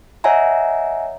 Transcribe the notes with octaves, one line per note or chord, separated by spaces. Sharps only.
C#5 D#5 E5 F#5 G#5 A#5